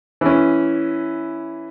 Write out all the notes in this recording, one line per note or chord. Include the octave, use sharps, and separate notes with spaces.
E3 C#4